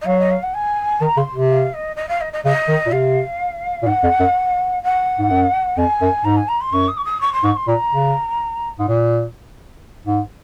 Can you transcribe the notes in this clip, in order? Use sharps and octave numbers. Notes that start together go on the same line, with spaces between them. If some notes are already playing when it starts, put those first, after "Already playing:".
D#5
F#3 F5
D#5
F5
F#5
G#5
D#3 A#5
C#3 C6
C3
F5
D#5
D#5
F5
D#5
D#5
C#3 D#5
D#3
A#2
C3 F5
A#2
G#2 F#5
F2
F#2
F#5
G#2
F#2
F2 G#5
F#2
G#2 A#5
G#5
A#5
C6
F#2 C#6
D#6
C#6
D#6
C#6
C6
G#2 C#6
C6
A#2 A#5
C#3
G#2
A#2
G#2